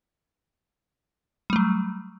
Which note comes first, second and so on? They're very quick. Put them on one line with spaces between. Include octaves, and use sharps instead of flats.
G3 A3 F#3